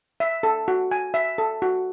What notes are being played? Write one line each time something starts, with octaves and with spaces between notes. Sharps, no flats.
E5
A4
F#4
G#5
E5
A4
F#4